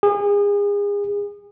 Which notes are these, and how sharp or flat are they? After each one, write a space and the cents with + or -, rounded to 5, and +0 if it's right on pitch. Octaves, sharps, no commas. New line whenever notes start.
G#4 -35